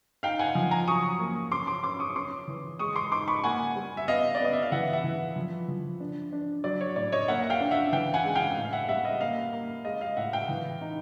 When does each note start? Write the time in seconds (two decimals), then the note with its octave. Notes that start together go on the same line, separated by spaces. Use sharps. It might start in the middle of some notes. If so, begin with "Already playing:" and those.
0.23 D#4 F5 G5
0.39 F#5 G#5
0.55 F3
0.71 G#5 A#5
0.88 F#3 C#6 D#6
1.20 A#3
1.52 C#4 C6 D6
1.67 C6 D6
1.83 C#4 C6 D6
2.00 C#6 D#6
2.16 C#4 C6 D6
2.48 E3
2.79 G#3 C#6 D#6
2.96 C6 D6
3.12 D#4 C6 D6
3.28 B5 C#6
3.44 A#3 F#5 G#5
3.75 G3
3.97 E5
4.08 B3 D#5 F5
4.35 D5
4.40 B3 D#5
4.53 E5
4.62 F5
4.72 E3 E5 F#5
4.93 E5 F#5
5.04 E3
5.36 F3
5.68 F3
6.00 D4
6.32 D4
6.64 F#3 D5
6.81 C#5
6.96 A2 D5
7.12 C#5 D#5
7.28 A#3 E5 F#5
7.44 F#5
7.50 F5 G5
7.61 D4
7.71 E5 F#5
7.92 E3 F5 G5
8.14 F#5 G#5
8.25 G#3
8.35 F5 G5
8.57 A2
8.65 F5
8.73 E5 F#5
8.89 G3 E5 F#5
9.04 D#5 F5
9.21 A#3 D#5 F5
9.53 A#3
9.85 G#3 D#5 F5
10.01 D#5 F5
10.17 A2 E5 F#5
10.33 F5 G5
10.49 E3
10.81 D#4